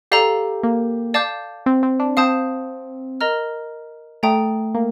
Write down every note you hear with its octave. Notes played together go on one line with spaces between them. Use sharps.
G4 A4 D5 F5 A#5
A#3
D5 F5 A5 D6 G6
C4
C4
D4
C4 F5 A5 D#6 G6
A#4 D#5 A#5 F6
A3 D5 G5 A#5 D#6
A#3